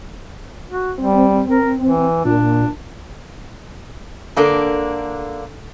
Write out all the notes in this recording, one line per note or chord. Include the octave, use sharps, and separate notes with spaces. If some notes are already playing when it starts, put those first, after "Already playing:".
F#4
G3 C4
A#4
E3
A#2 D4
D3 A#3 D4 A4 F5 A5